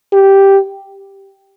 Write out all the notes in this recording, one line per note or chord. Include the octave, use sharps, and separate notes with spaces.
G4